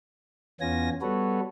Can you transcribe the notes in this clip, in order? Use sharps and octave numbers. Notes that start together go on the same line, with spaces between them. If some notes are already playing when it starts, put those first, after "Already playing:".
E2 B3 C#4 F4 G#5 A#6
G3 B3 F#4 A4 B4 C#5